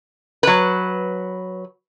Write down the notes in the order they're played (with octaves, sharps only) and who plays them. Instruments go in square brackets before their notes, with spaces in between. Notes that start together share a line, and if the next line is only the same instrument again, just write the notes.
[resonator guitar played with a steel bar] F#3 B4